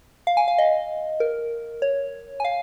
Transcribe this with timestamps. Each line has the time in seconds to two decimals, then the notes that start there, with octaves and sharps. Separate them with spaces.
0.27 F5
0.37 G#5
0.48 F5
0.58 D#5
1.20 A#4
1.82 C#5
2.40 G#5
2.45 F5